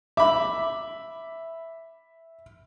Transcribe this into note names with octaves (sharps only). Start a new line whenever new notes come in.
E5 B5 D6